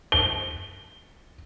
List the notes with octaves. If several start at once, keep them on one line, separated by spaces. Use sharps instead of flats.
G7